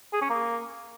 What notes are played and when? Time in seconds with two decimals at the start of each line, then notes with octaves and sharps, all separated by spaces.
0.13 G#4
0.22 C#4
0.30 A#3